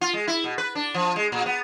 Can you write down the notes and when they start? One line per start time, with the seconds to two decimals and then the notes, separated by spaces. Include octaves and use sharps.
0.01 F4
0.13 G#3
0.27 E4
0.44 B2
0.58 B4
0.75 D4
0.94 F3
1.16 G#3
1.32 A#2
1.46 B3